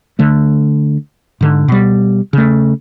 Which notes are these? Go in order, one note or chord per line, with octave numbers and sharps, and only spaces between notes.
D3 A3
G#2 D3
B2 G3
C#3 A3